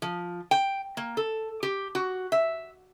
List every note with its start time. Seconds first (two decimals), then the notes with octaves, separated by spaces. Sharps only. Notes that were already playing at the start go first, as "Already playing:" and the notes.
0.02 F3
0.51 G5
0.97 A#3
1.17 A4
1.63 G4
1.95 F#4
2.32 E5